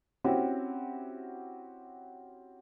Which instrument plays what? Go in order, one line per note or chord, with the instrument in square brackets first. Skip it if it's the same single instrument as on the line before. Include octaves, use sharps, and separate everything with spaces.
[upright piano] C4 C#4 E4 F#4 G4